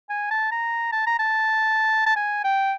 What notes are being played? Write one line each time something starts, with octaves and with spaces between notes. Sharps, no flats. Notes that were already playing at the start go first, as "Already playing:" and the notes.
G#5
A5
A#5
A5
A#5
A5
A5
G#5
G5